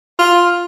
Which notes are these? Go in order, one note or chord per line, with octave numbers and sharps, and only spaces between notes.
F4